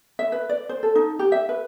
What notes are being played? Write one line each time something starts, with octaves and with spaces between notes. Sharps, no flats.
E5
B4
D5
C5
A4
D#4
G4
E5
B4